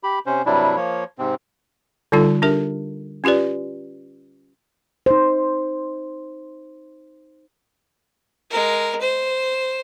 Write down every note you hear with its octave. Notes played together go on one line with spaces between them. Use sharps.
G4 B5
C3 C#4 C5
G2 C3 F#3 G3 D4 E4
F3 A#3 C#5
G#2 C3 C4
D3 G3 D#4 F4 A4
D4 G4 A#4 E5
C#4 F4 G4 B4 D5
D#4 C5
G#3 A#4
C5